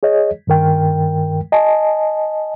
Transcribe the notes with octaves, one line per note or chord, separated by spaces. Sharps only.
G#4 C#5 D#5
G2 D#3 A#4 G5
D#5 G#5 A5